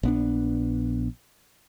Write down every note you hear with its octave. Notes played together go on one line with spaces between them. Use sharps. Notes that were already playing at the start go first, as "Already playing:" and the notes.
A#1 B3 D4